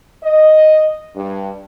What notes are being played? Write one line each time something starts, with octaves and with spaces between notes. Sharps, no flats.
D#5
G2